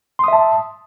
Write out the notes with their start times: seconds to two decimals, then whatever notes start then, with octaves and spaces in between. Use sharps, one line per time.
0.19 C6
0.24 D#6
0.28 E5
0.33 A5